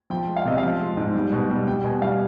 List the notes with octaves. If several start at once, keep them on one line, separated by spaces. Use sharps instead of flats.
F3 G5
G#3
F5
C3 D#5
F5
F3
G#3
G#2
G3
B2
G3
G3 G5
B2 G#5
G3 F5